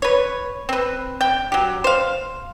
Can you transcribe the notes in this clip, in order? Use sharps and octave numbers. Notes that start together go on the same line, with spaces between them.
B4 C#5
C4 B4
G5
F#3 G4
C5 F5